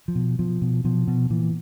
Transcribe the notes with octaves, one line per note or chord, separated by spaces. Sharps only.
F3
B2
B2 F3
B2
B2 F3
B2
A#2 E3